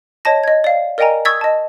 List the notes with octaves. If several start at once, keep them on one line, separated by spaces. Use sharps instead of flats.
C#5 D#5 A5 A#6
D#5 G#6
D5 F5
A#4 D5 D#5 G5 G#5 A#5
C#6 D#6 E6 G#6 A6 B6
D#5 A5